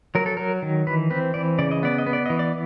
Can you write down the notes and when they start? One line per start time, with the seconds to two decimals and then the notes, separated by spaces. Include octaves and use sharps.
0.15 F#3 A#4
0.26 A4
0.37 F#3 A#4
0.62 D#3
0.87 E3 B4
1.10 C4 B4
1.34 E3 D5
1.58 C#3 D5
1.71 D#5
1.83 B3 D5
1.98 D#5
2.06 B3
2.13 D5
2.26 E3 D#5
2.39 D5